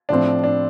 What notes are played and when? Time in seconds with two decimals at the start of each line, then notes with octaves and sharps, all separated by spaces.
0.09 A2 F3 C4 D4
0.44 D4